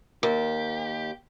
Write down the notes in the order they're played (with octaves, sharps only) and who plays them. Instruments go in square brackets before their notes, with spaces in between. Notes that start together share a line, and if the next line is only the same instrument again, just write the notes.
[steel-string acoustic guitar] D#2 [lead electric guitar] G4 [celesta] A#4